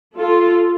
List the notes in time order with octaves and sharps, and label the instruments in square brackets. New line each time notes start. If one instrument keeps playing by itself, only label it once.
[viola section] F4 A4